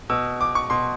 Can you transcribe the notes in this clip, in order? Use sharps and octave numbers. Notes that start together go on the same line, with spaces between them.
B2 E6
D6
C#6
B2 C6